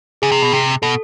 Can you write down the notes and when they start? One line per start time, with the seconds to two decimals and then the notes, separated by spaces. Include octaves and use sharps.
0.22 C#3 G#4
0.32 C3
0.42 B2
0.53 C3
0.82 B2 A4